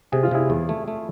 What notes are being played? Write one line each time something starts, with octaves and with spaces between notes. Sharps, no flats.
C3 G#4
F4
C3 E4 G#4
E2
A3
A3